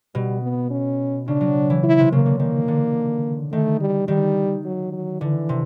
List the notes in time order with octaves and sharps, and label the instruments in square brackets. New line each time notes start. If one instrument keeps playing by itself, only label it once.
[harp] B2 [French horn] G3
[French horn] B3
C#4
[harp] C#3 [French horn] D4
[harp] F#3
E3
[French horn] E4
[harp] C3
[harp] C#3 [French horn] A#3
[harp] D3
[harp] D#3 [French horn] A#3
[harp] D3
[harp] D#3 [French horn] A3
[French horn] G3
[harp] D#3 [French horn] G3
[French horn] F#3
F#3
[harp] D3 [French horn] E3
[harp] C3